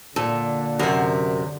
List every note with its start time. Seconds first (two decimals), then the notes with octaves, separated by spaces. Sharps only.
0.16 A#2 D3 A4
0.79 F#2 C3 A#4